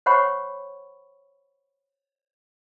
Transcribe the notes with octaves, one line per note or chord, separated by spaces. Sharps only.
C5 C#5 F#5 G5 B5 C#6